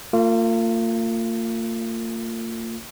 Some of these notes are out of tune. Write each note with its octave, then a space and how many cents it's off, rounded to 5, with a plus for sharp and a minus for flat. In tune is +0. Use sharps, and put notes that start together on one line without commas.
A#3 -40 F4 +0